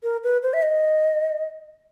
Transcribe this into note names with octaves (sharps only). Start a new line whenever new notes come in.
A#4
B4
C5
E5
D#5